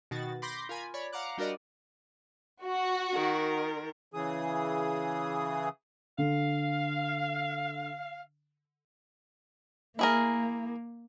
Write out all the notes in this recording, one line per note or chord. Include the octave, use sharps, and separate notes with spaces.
B2 D#3 F#4 A6
B5 C6 D6 G6 A#6
F4 A#4 G#5 B5
C#5 D5 B5
F5 F#5 A#5 D6 F#6
G3 D4 F#4 A#4 D5 D#5
F#4
D#3 A#4
C#3 E3 G#4 D#6
D3 F5
A#3 E4 G#4 A#4